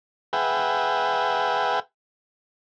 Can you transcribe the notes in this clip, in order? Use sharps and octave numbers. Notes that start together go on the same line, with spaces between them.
G#4 B4 E5 F#5 G5